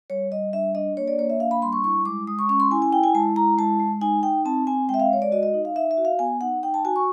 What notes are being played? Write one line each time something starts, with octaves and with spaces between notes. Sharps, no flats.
G3 C#5
G3 D#5
D4 E5
D4 D#5
A#3 C#5
D5
A#3 C#5
E5
D4 F5
B5
G3 C6
C#6
E4 C#6
G#3 D6
G#3 D#6
C#6
C#4 C#6
C6
E4 G#5
G#5
E4 G5
G#5
G#3 A5
E4 A#5
G#3 A5
G#3
D#4 G#5
D#4 G5
C4 A5
C4 G#5
G#3 G5
E5
F5
G#3 C#5
D5
F#4 D#5
D#5
D#4
F5
D#4 E5
E5
F#4
F5
B3 G#5
D#4 F#5
D#4 G5
A5
F#4 G#5
C#6